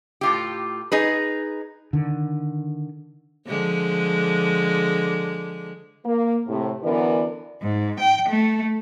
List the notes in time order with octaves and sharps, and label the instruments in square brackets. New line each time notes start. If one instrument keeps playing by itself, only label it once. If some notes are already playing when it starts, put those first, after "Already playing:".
[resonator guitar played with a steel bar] A2 F4 G4
D#4 G#4 B4
[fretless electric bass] D3 D#3
[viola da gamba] D3 F3 G#3
[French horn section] A#3
A2 C3
F#2 D3 E3 B3 A#4 D5
[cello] G#2
G5
A3